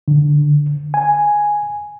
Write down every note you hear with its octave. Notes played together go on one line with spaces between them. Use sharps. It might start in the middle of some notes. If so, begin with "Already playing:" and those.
D3
G#5